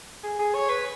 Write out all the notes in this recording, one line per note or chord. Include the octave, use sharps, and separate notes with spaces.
G#4
G#4
C#5
B4